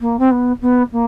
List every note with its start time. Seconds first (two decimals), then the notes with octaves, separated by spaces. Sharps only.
0.01 A#3
0.19 C4
0.31 B3
0.61 B3
0.92 A#3